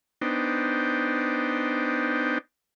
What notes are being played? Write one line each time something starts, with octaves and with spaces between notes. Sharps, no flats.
B3 D4 D#4 C5 G5